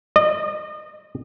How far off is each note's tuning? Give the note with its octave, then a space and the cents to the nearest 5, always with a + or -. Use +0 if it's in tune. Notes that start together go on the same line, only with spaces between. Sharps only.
D#5 -35